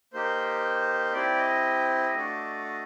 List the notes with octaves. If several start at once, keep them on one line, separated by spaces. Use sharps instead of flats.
A#3 D#4 G4 C5
C4 E4 G4 D5
D#5
A3 D4 F#4 A4
D#5